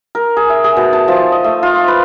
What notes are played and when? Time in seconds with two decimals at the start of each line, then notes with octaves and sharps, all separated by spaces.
0.15 A#4
0.37 G#4
0.50 E5
0.64 G#4
0.77 B2
0.93 A5
1.08 F3
1.32 D#5
1.44 A3
1.63 F4
1.88 B4